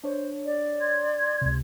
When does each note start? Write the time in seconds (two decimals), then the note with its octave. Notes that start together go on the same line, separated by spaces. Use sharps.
0.04 D4 C5 C#5
0.45 D5
0.80 C6 G#6
1.41 C#2 C3